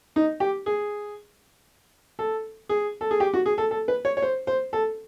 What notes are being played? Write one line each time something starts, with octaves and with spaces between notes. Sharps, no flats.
D#4
G4
G#4
A4
G#4
A4
G#4
G4
F#4
G#4
A4
A4
B4
C#5
C#5
C5
C5
A4